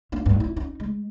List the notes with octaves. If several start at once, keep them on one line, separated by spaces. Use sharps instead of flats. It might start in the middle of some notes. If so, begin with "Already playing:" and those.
A#3 D4
A1 G2
E4
C#4 D#4
G#3